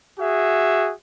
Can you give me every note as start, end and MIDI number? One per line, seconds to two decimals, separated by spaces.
0.19 0.91 66
0.19 0.91 68
0.19 0.91 76